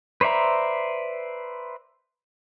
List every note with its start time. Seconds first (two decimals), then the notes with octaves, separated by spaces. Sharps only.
0.21 B4 C5 D5 E5 A#5